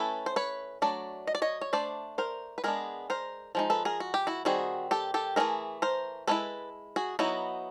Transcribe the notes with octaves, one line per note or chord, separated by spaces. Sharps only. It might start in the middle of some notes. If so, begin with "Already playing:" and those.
Already playing: A3 C#4 E4 A4 B4
C5
B4 C#5
F#3 A3 D4 D5
D#5
D5
C#5 D#5
C#5
A3 D4 C5 D5
A#4 C5
B4
G#3 B3 D4 G#4 A#4
A#4 C5
F3 G#3 D#4
A4 B4
G#4 A#4
F#4
G4
E4 F#4
D#3 G3 C4 F#4 G#4
G4 A4
G4 A4
E3 A3 C#4 E4 G#4 A#4
A#4 C5
G#3 C#4 E4 A4 B4
F#4 G#4
F#3 B3 D#4 E4 F#4